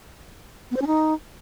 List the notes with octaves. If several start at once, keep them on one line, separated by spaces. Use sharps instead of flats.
B3
C5
C#4
D#4